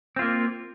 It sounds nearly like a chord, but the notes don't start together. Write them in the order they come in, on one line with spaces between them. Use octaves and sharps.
C4 F4 A#3